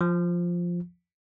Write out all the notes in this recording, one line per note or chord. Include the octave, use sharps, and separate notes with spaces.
F3